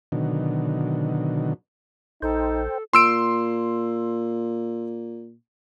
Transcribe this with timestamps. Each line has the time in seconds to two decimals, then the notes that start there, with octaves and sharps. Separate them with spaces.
0.12 B2 D3 D#3 F#3
2.22 A#1 D#4 A4 C5 G5
2.93 A#2 C6 E6 D7